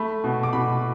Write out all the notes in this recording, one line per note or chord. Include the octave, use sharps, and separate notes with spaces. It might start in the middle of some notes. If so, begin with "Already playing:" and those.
Already playing: A3 B5
B2
D6
B2 B5